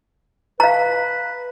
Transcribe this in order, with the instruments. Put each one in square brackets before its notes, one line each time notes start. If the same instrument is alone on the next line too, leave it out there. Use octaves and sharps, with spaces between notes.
[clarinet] B4 [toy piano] F5 A#5